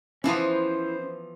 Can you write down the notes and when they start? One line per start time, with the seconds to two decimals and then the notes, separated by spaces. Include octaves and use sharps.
0.24 E3 F3 B3 C#4 E4 C5